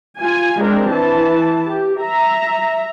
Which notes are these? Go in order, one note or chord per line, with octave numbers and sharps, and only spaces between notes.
F4 G#5
G#3 C4 D4 A#4
E3 A5
G4
E5 A#5